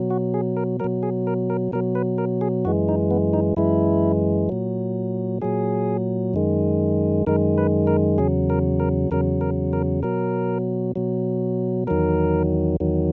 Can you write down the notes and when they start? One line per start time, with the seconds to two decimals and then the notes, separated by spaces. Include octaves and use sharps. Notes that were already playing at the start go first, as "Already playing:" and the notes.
Already playing: B2 F#3
0.10 F#4
0.34 G#4
0.57 A#4
0.80 B2 F#3 A#4
1.03 G#4
1.27 A#4
1.50 A#4
1.72 B2 F#3 A#4
1.95 B4
2.18 A#4
2.41 G#4
2.65 F#2 E3 G#3 F#4
2.89 D#4
3.11 B3
3.33 D#4
3.57 F#2 E3 G#3 E4
4.49 A#2 F#3
5.42 A#2 F#3 G#4
6.34 F#2 D#3 G#3
7.27 F#2 D#3 G#3 A#4
7.58 B4
7.87 A#4
8.18 E2 C#3 F#3 G#4
8.50 A#4
8.80 A#4
9.11 E2 C#3 F#3 A#4
9.41 A#4
9.73 A#4
10.03 B2 F#3 A#4
10.96 B2 F#3
11.87 E2 D#3 F#3 A#4
12.80 E2 D#3 F#3